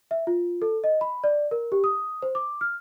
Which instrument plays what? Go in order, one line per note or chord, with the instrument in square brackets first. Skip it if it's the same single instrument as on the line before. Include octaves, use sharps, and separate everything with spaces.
[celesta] E5
F4
A4
D#5
B5
D5
A#4
G4
D#6
C5
D6
F6